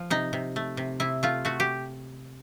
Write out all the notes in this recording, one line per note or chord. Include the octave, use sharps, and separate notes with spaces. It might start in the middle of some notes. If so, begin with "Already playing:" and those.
Already playing: F3
C3 D#4
C3
A3
C3
C3 E4
A3 F4
A3 F#4
G4